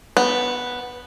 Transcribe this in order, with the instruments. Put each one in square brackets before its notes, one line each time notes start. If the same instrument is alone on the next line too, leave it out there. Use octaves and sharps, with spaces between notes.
[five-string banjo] B3